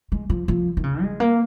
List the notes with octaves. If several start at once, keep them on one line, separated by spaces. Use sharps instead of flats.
G#3
F3
F3
D#3
C#3
G#3
A#3